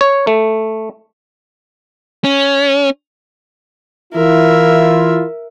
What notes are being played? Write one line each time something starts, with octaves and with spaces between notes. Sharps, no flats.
C#5
A3
C#4
E3 E4 F4 A#4 E5